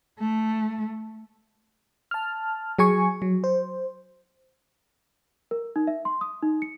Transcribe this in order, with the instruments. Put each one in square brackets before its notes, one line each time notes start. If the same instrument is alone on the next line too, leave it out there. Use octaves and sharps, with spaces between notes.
[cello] A3
[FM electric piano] A5 F6
F#3 G#4 G#5 C#6
F#3
C5
[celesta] A#4
D#4
E5
C6
D#6
D#4
C#7